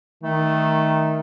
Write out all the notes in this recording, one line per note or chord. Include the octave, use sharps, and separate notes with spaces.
D#3 A3